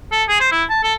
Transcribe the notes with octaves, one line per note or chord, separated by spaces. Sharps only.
A4
G#4
C5
E4
A5
A4